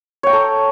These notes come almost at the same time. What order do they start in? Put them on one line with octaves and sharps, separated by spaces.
C#5 G5 A#5 A4